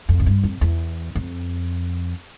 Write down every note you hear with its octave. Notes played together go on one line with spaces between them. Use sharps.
F2
A2
G2
F2
E2
F2